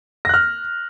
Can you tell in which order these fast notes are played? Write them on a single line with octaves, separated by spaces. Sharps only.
A#6 F#6 F6